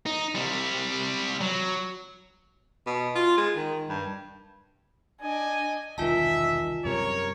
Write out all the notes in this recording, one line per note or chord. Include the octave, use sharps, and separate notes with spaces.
D#4
C3 G3
F#3
B2
F4
G#3
D#3
G2
D4 D#5 G#5
E1 C2 D#3 F4 D#5 E5 G#5 A5
F#2 C3 G3 A#4 C#5